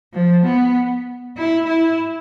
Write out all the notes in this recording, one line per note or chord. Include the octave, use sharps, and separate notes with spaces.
F3
B3
E4
E4